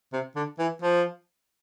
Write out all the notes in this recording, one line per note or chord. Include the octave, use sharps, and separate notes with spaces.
C3
D3
E3
F3